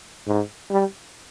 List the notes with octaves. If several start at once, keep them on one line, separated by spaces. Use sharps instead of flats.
G#2
G3